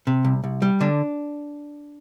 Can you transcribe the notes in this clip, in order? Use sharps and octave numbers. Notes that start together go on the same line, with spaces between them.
C3
C2
C2
G3
D3 D4